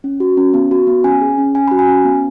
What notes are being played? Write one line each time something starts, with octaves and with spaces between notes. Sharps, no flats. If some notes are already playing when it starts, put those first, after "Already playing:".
C#4
F#4
C#4
B3
F#4
B3
C#4 G#5
G#4
C#4
C#4 G#5
F#4 B5
G#5
C#4
B3